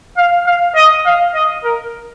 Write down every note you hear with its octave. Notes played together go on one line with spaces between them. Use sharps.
F5
F5
D#5
F5
D#5
A#4